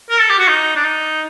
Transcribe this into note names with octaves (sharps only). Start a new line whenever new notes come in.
A#4
A4
G4
F#4
D#4
D4
D#4